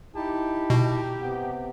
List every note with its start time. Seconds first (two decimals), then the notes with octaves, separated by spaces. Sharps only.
0.15 D#4 E4 G4 A5
0.70 B2
1.19 C3 B3